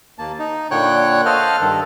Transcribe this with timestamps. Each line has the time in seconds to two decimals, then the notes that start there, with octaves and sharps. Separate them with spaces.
0.19 D#2 A#3 A5
0.39 D#4
0.71 A#2 D3 C#5 F#5 G5 F#6
1.26 A4 C5 D#5 F5 F#5 F6
1.61 G2 D#3 A4